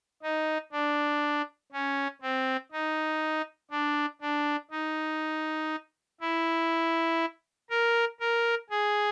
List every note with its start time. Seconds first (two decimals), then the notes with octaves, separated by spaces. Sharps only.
0.23 D#4
0.72 D4
1.72 C#4
2.22 C4
2.72 D#4
3.71 D4
4.21 D4
4.71 D#4
6.21 E4
7.70 A#4
8.20 A#4
8.70 G#4